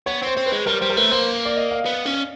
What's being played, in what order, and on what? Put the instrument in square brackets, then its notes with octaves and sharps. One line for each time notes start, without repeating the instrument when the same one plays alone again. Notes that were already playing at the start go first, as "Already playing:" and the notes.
[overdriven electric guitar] B3 [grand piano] C#5
[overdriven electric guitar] C4 [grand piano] C5
[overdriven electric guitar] C4
[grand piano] B4
[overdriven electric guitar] G#3
[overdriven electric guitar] G3 [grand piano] A#4
[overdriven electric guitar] G3 [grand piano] C5
[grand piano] A#4
[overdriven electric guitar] A3 [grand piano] B4
[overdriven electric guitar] A#3 [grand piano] C5
[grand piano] D5
D#5
F5
[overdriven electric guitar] B3
C#4